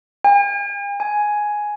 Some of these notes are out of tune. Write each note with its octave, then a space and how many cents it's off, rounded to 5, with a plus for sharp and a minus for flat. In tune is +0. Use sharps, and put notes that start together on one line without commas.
G#5 -45
G#5 +5